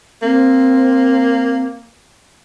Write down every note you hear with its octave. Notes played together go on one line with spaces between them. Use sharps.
A#3 C4